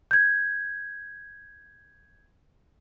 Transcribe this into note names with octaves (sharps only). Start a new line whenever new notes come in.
G6 G#6